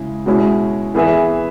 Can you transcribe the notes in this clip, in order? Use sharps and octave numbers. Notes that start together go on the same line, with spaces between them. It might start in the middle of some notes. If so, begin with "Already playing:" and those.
Already playing: C#3 G#3 E4
B2 G#3 C#4 E4
E3 B3 G#4 B4 E5